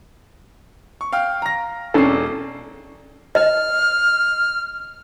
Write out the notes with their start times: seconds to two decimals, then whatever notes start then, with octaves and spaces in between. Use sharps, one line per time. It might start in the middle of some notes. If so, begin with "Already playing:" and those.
1.01 C#6
1.13 F5 G5 F6
1.42 A#5 A#6
1.94 E1 C#4 D4 A4 C7
3.35 D#5 F6